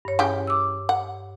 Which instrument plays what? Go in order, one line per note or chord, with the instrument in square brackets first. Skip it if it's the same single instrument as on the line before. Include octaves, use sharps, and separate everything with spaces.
[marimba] G2 C#5
[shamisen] C#3 E3 G4
[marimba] D6 E6
[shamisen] F#5